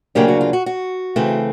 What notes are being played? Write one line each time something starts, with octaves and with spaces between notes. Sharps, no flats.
D2 C#3 F#3 A#3 D4 G4
F#4
F4
F#4
F#4
C#3 E3 A3 C4